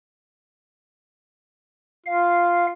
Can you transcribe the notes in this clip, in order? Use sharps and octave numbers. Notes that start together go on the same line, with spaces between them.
F4 F5